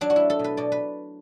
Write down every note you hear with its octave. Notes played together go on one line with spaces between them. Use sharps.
F#3 D4
F#4
A3 E4
A4
B2
B4
B2 D5
B4